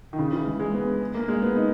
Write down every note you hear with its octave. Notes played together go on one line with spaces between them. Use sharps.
D#3
C#3
E3
G#3
G#3
B3
A#3
G#3
B3
D#4